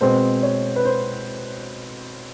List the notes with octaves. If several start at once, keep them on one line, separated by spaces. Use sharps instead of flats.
B2 G#3 C4 C5
C#5
B4
C5